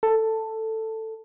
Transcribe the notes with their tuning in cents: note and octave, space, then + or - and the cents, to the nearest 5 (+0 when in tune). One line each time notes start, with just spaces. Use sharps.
A4 +10